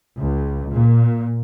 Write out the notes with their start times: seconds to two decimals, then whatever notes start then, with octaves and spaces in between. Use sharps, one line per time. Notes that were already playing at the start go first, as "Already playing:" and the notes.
0.19 C#2
0.72 A#2